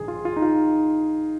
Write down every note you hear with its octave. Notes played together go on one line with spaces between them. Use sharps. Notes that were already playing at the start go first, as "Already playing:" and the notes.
Already playing: A#1 G#2 D#3 G#4
F4
F4
D#4
F4